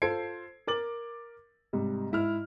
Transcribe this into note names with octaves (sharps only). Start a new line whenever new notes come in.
F4 A4 C5 G#6 C7 D7
A#4 D6 A6 F#7
G#2 C3 G3
G#2 E4 F6